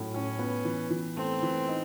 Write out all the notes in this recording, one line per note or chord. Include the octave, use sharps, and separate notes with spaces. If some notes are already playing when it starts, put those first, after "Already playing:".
Already playing: A2 F#3
A2 C#4
B3
E3
E3
A3 C4
E3
D#4